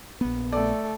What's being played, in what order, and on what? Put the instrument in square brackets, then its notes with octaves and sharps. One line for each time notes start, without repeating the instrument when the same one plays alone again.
[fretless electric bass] A#1 B3
[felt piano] A3 D5 [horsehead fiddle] A4